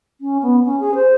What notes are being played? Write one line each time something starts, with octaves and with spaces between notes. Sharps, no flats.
C#4
B3
C#4
G#4
C5